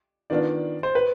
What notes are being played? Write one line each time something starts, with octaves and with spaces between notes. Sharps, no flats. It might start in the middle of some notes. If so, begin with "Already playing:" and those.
D#3 B3 D4 F4 D5
C5
B4